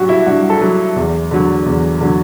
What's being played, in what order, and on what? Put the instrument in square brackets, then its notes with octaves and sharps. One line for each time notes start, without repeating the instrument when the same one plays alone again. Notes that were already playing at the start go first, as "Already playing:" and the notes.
Already playing: [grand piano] G2 F#3 F#4 G4
E4
G2 F#4
A4
F#3
E2
D3 F#3
E2
D3 F#3